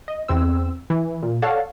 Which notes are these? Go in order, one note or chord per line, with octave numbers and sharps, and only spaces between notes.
D#5
E2 C4 E6
E3
A#2
A4 C#5 D5 F5 F#5 A5